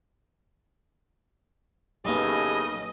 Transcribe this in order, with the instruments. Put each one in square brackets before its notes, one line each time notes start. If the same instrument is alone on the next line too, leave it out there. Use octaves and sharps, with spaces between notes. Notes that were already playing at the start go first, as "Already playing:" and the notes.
[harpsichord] B1 A#3 B3 [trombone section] A2 C#3 [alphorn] G4 [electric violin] D#5